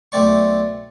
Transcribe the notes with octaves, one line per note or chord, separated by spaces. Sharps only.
B1 A3 C4 D5 C#6